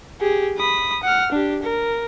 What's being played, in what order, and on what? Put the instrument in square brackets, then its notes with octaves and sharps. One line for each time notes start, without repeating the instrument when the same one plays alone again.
[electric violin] G4 G#4
B5 D#6
F#5 F6
D4 G4
A#4